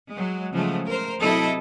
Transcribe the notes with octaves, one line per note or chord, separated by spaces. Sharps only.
F#3 G#3
C#3 F3 F#3 G#3 A3
A#4 C5
C3 F#3 E4 A4 D#5